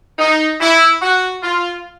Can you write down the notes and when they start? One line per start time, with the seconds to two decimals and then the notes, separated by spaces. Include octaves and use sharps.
0.19 D#4
0.60 E4
1.01 F#4
1.42 F4